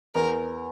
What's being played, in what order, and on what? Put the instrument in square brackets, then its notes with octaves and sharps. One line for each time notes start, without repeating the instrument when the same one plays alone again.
[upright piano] E2 [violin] A#4